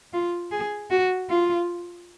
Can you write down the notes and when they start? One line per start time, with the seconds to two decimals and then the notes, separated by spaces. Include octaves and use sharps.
0.13 F4
0.52 G#4
0.91 F#4
1.30 F4